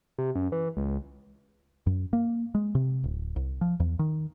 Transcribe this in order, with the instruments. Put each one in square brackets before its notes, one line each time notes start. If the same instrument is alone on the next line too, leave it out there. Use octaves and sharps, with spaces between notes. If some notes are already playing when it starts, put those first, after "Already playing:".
[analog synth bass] C3
F#2
E3
C#2
[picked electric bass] F#2
A#3
G#3
C3
D1
C2
F3
E2
D#3